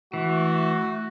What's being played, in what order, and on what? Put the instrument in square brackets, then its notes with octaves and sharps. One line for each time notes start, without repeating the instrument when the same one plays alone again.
[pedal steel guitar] E3 [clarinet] A3 [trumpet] F#4